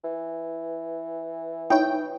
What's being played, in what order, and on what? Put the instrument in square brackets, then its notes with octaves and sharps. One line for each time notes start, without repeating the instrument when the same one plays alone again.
[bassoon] E3
[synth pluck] D#4 E4 C#5 [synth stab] G5